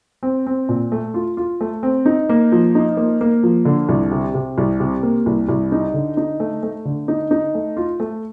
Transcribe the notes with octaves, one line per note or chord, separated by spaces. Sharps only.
C4
C4
A#2
A3
F4
F4
A3
C4
D#4
A#3
F3
D#4
A#3
A#3
F3
D3
C2
C3
C3
C2
C3
A#3
C2
C2
D#4
D3
D#4
A3
A3
D3
D#4
D#4
A3
F4
A3